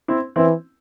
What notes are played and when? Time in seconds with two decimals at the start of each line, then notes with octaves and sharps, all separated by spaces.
0.08 C4 E4
0.36 E3 C4 E4